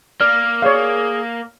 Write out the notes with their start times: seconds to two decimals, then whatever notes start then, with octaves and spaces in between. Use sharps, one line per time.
0.21 A#3 D5 F6
0.62 G#4 C#5 D5 F5